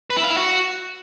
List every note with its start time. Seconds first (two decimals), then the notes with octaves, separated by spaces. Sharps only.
0.10 B4
0.17 E4
0.24 F5
0.30 E4
0.37 F#4